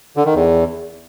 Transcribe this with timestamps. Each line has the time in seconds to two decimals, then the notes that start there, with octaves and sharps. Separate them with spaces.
0.17 D3
0.26 D#3
0.34 E2